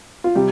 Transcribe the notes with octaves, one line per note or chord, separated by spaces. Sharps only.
F4
C3 G3 G4